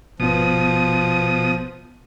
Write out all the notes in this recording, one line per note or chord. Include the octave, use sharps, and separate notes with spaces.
G#1 B2 F3 B3 D#6